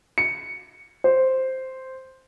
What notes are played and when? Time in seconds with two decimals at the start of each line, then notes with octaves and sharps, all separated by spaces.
0.18 C#7
1.04 C5